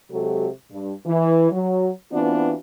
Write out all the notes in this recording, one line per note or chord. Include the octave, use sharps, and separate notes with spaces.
C3 F#3 G#3 F#4 G4 A4
G2
E3
F#3
E3 B3 C4 D4 F4 F#4